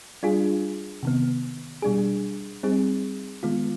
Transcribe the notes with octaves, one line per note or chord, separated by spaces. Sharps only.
G3 D4 F4 G#4
C3 D#3 B3
B2 G3 D4 G#4
G3 C4 D#4 G#4
D#3 G#3 B3 F4